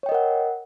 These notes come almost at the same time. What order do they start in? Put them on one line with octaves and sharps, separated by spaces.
C#5 G5 D#5 A#4 F#5